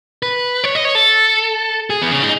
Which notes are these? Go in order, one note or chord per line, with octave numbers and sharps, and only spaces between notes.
B4
C#5
D#5
C#5
A4
G#4
B3
C#4
D#4